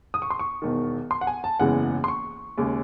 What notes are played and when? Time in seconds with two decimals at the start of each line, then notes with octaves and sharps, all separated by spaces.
0.14 D#6
0.22 C#6
0.30 C6
0.39 C#6
0.62 E1 E2 D#3
1.11 C6
1.21 F#5
1.27 G#5
1.44 A5
1.60 F#1 E2 C#3 E3 G#3 F#5
2.04 C6
2.08 C#6
2.58 D#2 C#3 G#3